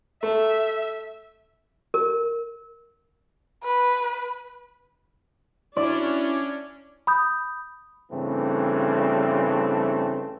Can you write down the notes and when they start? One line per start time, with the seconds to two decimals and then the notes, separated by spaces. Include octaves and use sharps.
0.23 A3 E5
1.94 A#4
3.64 B4
5.77 C#4 D4 E4 D5
7.07 B5 D#6 G6
8.11 G2 C#3 E3 A3 C4